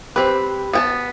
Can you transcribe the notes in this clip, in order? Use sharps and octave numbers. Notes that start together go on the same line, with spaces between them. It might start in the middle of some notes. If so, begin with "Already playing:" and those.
C4 G4 B4 B5 F#6
B3 G5 A5